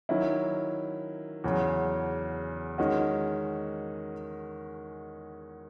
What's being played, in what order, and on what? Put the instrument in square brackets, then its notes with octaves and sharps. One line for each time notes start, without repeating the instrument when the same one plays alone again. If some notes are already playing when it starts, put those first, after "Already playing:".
[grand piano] D#3 F#3 C#4 E4
E2 C#3 F#3
D#3 G#3 C#4 F#4